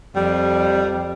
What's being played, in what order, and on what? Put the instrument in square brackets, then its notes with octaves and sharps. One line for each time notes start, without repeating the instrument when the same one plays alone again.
[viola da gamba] F2 [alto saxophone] G3